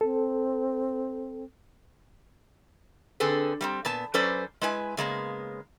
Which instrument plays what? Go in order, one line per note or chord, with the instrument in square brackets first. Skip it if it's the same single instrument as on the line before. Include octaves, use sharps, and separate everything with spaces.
[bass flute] C4 [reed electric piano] A4
[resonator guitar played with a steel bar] D3 C4 G#4 A4 B4
G3 A#3 C4
A#2 B3 A5
F#3 C#4 A4 B4 C5 D5
G#3 E4 B4 G#5
C#3 G#3 A#3 B3